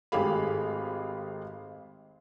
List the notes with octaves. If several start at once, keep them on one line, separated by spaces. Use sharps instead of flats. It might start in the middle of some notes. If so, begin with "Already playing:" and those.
G#1 A3 G4 G#4 F5 B5